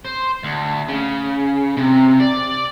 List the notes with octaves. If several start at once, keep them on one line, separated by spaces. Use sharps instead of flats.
C5
D2
C#3
C3
D5